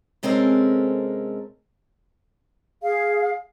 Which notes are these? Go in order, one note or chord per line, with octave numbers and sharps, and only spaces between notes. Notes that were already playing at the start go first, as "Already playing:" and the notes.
C3 G#3 C4 C#4 A4 A#4
G#4 F5